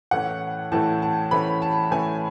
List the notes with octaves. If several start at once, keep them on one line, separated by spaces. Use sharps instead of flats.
A2 E3 A3 C#4 F#5
A2 E3 A3 C#4 A5
A5
A2 E3 A3 C#4 B5
A5
A2 E3 A3 C#4 G#5